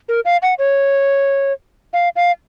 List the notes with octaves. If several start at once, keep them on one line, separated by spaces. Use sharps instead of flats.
A#4
F5
F#5
C#5
F5
F5